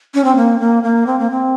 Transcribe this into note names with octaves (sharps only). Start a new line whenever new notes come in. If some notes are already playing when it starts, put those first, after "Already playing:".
C#4
C4
A#3
A#3
A#3
C4
A#3
C4